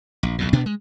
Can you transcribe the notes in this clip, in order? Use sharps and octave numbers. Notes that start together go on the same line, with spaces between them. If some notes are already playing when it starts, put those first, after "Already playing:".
A#1
B1 E2 A#2
D2 B2 B3 D4
G#3